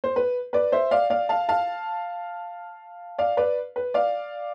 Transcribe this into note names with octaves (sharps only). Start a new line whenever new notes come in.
C5
B4
B4 D5
C5 E5
D5 F5
D5 F5
F5 A5
F5 A5
D5 F5
B4 D5
B4
D5 F5